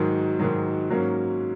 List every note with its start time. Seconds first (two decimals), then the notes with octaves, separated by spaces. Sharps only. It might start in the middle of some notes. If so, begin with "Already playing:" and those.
Already playing: G#2 D#3 F#3
0.39 G#2 D#3 F#3
0.90 G#2 F#3 A#3 C#4